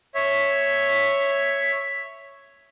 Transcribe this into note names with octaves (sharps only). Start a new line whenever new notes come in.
C#5 E5